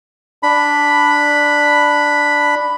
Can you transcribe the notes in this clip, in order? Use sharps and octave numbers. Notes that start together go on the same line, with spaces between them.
D4 B5